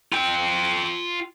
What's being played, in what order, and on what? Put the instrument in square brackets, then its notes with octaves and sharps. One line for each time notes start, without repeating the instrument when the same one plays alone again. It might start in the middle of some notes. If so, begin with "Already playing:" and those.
[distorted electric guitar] F4 G5